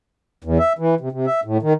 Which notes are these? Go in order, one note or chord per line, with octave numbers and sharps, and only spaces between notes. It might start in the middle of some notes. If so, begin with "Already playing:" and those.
E2
E5
E3
C3
C3
E5
A2
D#3